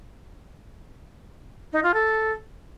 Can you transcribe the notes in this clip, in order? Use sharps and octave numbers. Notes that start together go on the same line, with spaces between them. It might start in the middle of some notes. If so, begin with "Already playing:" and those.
D#4
F4
A4